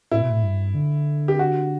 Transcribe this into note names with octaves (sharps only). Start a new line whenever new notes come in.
A2 E4
B2
A2
G2
D3
G4
F#4